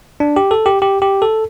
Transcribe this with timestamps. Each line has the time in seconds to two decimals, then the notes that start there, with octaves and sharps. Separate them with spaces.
0.20 D4
0.36 G4
0.51 A4
0.66 G4
0.82 G4
1.02 G4
1.22 A4